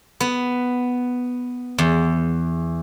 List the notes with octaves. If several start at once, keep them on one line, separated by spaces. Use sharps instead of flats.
B3
E2